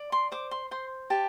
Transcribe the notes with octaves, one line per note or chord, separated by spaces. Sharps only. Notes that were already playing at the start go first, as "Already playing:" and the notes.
Already playing: D5
C6
C5 D6
C6
C5 C6
G4 A5